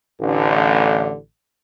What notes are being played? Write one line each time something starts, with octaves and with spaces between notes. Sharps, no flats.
A1 D3